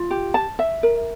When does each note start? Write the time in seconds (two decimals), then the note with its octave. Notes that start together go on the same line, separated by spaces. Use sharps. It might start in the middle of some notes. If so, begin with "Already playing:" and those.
Already playing: F4
0.11 G4
0.34 A5
0.59 E5
0.83 A#4